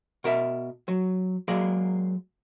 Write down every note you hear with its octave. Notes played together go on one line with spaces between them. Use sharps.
B2 A#4 E5
F#3
F#3 G#3 A#3 G#4 D5